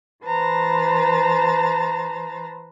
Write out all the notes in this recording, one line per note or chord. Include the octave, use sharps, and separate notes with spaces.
E3 B4 C5 A5 A#5 A6